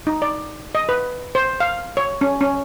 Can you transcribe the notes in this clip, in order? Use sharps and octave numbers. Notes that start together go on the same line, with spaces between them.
D#4
D5
D#5
B4
C5
F5
C#5
C#4
C#4